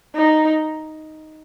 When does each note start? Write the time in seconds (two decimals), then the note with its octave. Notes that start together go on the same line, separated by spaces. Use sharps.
0.15 D#4